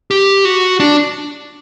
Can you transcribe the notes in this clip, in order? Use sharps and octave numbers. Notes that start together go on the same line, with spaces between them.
G4
F#4
D4